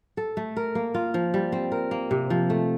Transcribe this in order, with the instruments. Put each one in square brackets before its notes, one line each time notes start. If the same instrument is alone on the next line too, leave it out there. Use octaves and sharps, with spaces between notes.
[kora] A4
A3
A#4
A#3
F4
F3
G3
C4
A#4
A#3
C3
F3
A3